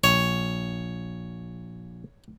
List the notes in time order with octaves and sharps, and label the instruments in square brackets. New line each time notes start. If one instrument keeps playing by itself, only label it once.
[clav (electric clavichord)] A#1 [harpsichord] C#5